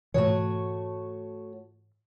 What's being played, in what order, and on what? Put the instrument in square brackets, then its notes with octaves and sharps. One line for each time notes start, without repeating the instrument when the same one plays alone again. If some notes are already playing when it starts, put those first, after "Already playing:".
[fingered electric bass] G#2 B2 E3 [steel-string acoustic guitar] A3 F#4 C#5